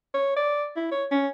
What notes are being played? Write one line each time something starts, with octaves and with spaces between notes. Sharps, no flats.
C#5
D5
E4
C#5
C#4